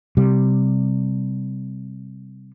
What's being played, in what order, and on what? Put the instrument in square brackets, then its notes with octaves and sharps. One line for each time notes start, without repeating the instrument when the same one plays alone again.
[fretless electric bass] C3 G3